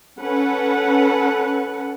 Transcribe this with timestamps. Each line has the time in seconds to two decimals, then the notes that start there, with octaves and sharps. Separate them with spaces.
0.19 C#4 A4 B4 F#5